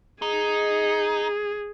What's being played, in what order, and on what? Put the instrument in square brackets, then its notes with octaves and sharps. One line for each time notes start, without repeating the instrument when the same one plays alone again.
[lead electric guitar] D#4 [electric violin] G#4